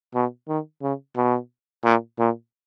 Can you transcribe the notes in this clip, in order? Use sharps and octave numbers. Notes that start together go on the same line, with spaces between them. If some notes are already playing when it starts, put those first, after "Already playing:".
B2
D#3
C#3
B2
A#2
A#2